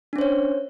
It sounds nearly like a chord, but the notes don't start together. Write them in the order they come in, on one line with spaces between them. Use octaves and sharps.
D4 C#4 C5 C#5